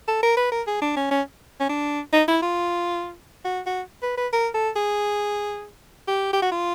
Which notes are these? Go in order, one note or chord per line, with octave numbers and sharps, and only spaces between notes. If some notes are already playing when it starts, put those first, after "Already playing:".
A4
A#4
B4
A#4
G#4
D4
C#4
C#4
C#4
D4
D#4
E4
F4
F#4
F#4
B4
B4
A#4
A4
G#4
G4
G4
F#4
F4